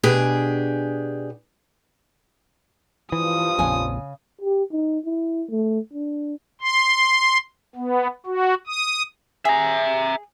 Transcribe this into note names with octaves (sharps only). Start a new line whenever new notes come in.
B2 D4 G4 G#4
G2 E3 F3 F4 D#6
A#1 F2 C#3 G#5
G4
D#4
E4
A3
D4
C6
B3
F#4
D#6
G#4 E5 A#5